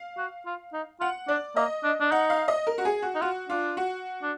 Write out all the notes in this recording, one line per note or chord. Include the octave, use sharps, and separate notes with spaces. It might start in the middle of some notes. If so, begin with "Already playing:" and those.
Already playing: F5
F#4
F4
D#4
F4 F#5
D4 D5
A#3 D#5
D4
D4
D#4 F#5
F5
D#5
A#4
F#4
G#4
F#4
D#4
F4 F#4
D4 F4
F#4
D4